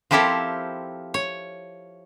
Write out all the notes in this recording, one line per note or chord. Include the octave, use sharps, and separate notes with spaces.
F3 C4 E4 G4 A4 A#4
C#5